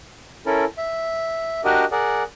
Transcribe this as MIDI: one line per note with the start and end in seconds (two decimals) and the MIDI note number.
0.46 0.65 61
0.46 0.65 64
0.46 0.65 69
0.46 0.65 70
0.78 1.61 76
1.64 1.85 62
1.64 1.85 66
1.64 1.85 67
1.64 1.85 70
1.64 1.85 75
1.92 2.23 68
1.92 2.23 70
1.92 2.23 74
1.92 2.23 78